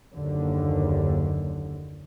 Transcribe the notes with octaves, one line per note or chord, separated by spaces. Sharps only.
F#1 D#2 D3